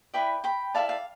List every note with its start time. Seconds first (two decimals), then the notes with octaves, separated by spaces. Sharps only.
0.14 E4 B4 D5 G5 B5
0.44 G5 B5
0.74 E4 A4 D5 F5 A5
0.89 F5